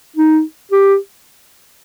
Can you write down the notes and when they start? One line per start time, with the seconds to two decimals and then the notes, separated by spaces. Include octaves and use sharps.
0.16 D#4
0.71 G4